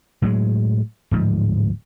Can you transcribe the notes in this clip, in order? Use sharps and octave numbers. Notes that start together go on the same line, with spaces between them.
A2 F#3 G#3
D1 G#2 F3